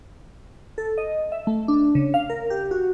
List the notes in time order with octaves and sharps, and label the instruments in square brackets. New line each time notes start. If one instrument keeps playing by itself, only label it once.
[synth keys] A4
D#5
E5
A3
D4
C#3
F5
A#4
G4
F#4